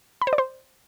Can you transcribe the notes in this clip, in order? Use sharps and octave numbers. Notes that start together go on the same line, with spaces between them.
B5
C5
D5
C5